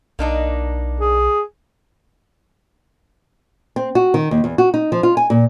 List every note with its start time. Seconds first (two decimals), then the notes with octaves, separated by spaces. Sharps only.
0.19 B1 A#3 D4 D#4
1.00 G#4
3.76 C4
3.95 F#4
4.14 D#3
4.31 D#2
4.44 E2
4.58 F#4
4.74 D#4
4.92 F3
5.03 F4
5.17 G#5
5.30 A#2